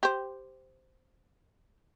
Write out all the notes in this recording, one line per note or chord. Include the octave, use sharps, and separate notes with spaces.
G4 C5